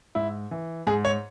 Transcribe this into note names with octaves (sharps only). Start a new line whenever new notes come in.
G#2 E4
E3
G#2 G#4
C#5